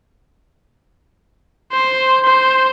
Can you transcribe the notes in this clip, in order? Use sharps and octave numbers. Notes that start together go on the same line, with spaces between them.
C5
C5